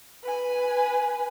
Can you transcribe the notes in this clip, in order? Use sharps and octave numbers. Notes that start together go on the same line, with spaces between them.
B4 G#5